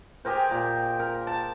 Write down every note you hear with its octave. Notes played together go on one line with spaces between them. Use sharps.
G4 G#4 A#4 C5
A#2
A#4
A5